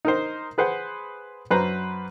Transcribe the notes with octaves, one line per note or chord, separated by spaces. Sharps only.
D#4 A#4 C5
G#4 B4 C5 F#5
F#2 B4 C5 A#5